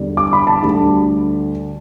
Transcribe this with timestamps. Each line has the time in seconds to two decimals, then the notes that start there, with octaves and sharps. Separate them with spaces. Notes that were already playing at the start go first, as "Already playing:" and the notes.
Already playing: E2 D3 G3
0.17 D6
0.33 B5
0.47 A5
0.63 D2 D3 G3